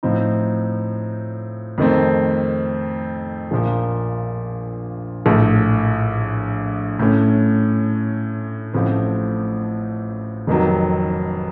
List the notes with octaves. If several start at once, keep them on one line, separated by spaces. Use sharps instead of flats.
A2 F3 C4 D#4
F2 D#3 A3 C4
A#1 A#2 F3
A#1 A2 A3
A2 A3 C#4
A1 A2 F3 A3 C4
F1 F2 D#3 F#3